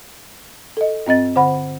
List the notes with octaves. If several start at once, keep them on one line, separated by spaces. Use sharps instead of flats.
A4 D#5
G2 C4 D#5 A6
D3 C5 F#5 B5